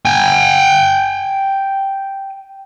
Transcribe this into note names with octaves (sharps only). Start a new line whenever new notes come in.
G5 G#5